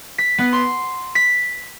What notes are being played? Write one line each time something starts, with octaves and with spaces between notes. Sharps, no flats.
B6
B3
C6
B6